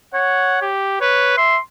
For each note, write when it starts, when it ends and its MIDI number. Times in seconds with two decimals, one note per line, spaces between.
0.14 0.68 73
0.14 0.61 78
0.62 1.00 67
1.01 1.32 71
1.01 1.36 73
1.37 1.57 76
1.37 1.58 84